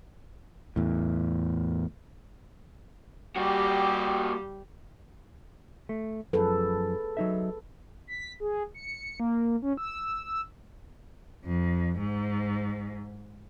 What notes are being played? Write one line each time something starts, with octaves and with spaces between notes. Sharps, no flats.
E2 A2
G3 A#3 F#4 G4
A3
F#2 F3 G#4 A4 B4
F#3 D#4 E5
B6
G#4
C#7
A#3
C#4
E6
E6
F2
G#2